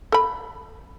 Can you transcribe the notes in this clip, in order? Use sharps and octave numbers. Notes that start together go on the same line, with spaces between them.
A4 B5